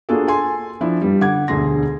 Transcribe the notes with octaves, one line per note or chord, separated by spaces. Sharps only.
A#3 D4 F4 F#4 G#4 A4
A4 G#5 C6
F3 D4 E4
G2 G3
D3 F#5 D6 G#6
E1 D2 D3 G#4 C6 A#6